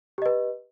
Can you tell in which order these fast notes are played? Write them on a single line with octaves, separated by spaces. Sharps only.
G4 D#5 B4